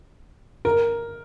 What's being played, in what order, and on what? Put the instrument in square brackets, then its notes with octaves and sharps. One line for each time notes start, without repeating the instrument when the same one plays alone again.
[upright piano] A#4